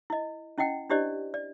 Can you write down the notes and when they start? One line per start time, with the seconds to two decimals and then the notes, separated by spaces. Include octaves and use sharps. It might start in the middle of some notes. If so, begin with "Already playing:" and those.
0.10 E4 D#5
0.58 C#4 E4 D#5 F#5 G5
0.90 D4 E4 G4 C5 D5 D#5
1.34 D5